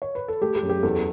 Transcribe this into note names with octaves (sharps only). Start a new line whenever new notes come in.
C#5
B4
A4
A3 G4
G4
F#2
G4
E2 A4